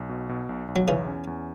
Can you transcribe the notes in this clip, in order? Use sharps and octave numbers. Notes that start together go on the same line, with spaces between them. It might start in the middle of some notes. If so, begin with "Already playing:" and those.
Already playing: B1
B2
B2
B1
B1
F#3
E2 C#3 E3
C#4
E2